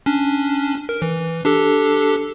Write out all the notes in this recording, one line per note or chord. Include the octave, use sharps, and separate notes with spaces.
C#4 D4
A#4
E3
D4 G4 A4